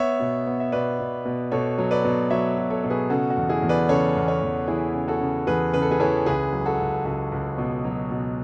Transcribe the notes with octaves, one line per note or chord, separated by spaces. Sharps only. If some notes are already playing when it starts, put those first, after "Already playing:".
Already playing: B3 C#5 E5
B2
B3
E5
B2 B4 D5
B2
B2
B2 A4 C#5
F#3
B4 D5
B2
F#3 C#5 E5
B2
A4 C#5
B2 C#5
G#4 B4
C#3 F#4 A4
F#4
E2
E4 G#4
E2
B4 D5
C#3 A4 C#5
E2
A4 C#5
E2
E3 E4 G#4
C#3
F#4 A4
C#3
E2 G#4 B4
C#3 B4
A4
G#4 B4
E3 A4 C#5
C#2 G#4 B4
F#3
F#4 A4
C#2
C#2 F#4
C#2
B2
F#3
B2